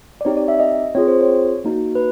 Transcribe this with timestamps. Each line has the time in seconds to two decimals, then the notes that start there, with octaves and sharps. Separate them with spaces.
0.21 D5
0.25 C4 D#4 G4 C#5
0.37 D5
0.48 E5
0.60 D#5
0.95 C4 F4 G#4 C#5
1.08 C5
1.21 C#5
1.64 A#3 D#4 F#4
1.95 B4